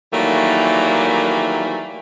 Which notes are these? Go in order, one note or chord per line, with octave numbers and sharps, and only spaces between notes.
D#3 E3 F#3 G3 A3 A#3